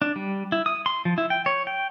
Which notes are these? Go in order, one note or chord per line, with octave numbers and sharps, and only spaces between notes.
D4
G3
E4
D#6
C6
F3
E4
G5
C#5
G5